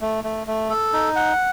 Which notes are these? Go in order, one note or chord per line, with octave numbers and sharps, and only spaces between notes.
A3
A3
A3
A4
D#4
F#5